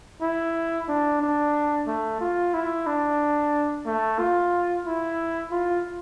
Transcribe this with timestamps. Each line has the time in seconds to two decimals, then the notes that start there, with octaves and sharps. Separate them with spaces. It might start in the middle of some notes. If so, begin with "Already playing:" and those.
0.21 E4
0.88 D4
1.21 D4
1.87 A3
2.21 F4
2.54 E4
2.86 D4
3.86 A3
4.19 F4
4.86 E4
5.51 F4